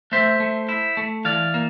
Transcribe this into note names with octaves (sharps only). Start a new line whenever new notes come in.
A3 C5 E5
A3
E4
A3
E3 D5 F5
A#3